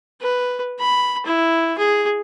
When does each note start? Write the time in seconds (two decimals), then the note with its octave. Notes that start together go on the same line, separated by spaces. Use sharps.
0.21 B4
0.79 B5
1.26 E4
1.78 G#4